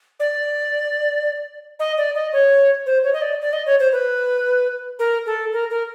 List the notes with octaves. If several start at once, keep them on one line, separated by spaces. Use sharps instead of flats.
D5
D#5
D5
D#5
C#5
C5
C#5
D#5
D5
D5
D#5
C#5
C5
B4
A#4
A4
A#4
A#4